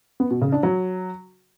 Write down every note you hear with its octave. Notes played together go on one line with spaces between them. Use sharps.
B3
B2
C#3
D4
F#3